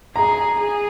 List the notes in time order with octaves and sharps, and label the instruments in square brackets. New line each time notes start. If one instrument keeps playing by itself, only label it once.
[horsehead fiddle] G#4 [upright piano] A#5
[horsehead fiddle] G#4